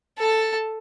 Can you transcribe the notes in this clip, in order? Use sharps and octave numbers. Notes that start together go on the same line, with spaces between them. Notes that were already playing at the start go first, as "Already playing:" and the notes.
A4 A5